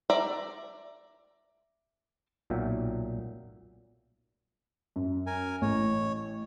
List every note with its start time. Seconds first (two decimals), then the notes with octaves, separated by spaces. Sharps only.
0.10 D5 E5 A#5
2.50 B1 A#2 F#3 E5 G5
4.96 F#2
5.27 A#4 G#5
5.62 A1 C#5